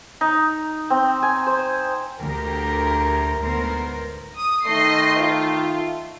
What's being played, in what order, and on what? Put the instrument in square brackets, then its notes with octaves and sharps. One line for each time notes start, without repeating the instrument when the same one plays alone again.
[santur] D#4
C4
G#5
C5
[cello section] D2 G4 A#4
D2 G#2 B3 A#4 C5
[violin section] D#6
[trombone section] D#3 A3 [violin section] D#5 C6 C7
[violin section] F4